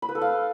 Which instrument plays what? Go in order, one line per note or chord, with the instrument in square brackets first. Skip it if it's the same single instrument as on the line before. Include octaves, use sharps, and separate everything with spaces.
[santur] B5
B4
A4
F5